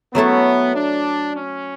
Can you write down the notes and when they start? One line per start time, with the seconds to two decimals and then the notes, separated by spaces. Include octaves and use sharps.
0.14 F#3 A3 B3 E4 A4
0.75 D4
1.35 C#4